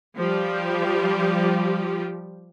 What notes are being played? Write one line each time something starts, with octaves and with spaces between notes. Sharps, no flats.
F3 G3 G4